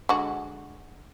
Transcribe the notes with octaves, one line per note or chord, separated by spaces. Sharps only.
D3 G#3 F#4